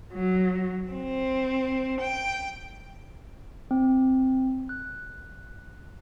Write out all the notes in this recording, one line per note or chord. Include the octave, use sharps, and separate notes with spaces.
F#3
C4
G5
C4
F#6